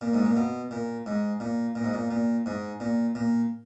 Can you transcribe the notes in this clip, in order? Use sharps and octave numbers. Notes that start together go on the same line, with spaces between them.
A#2
G#2
A#2
B2
A#2
G#2
A#2
A#2
G#2
A#2
A#2
G#2
A#2
A#2